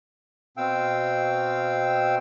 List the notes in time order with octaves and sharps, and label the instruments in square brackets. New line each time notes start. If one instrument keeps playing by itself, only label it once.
[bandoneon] B2 C4 F5 G5 E6